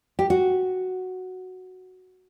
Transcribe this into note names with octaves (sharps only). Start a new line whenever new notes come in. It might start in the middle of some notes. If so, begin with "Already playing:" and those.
G4
F#4